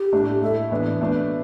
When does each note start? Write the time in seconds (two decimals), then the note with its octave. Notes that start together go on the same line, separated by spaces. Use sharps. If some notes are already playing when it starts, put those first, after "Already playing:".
Already playing: G4
0.13 A2 A3 D4
0.41 A2 A3 E4 A4
0.71 A2 E3 B3 D4
1.00 B2 A3 D4 B4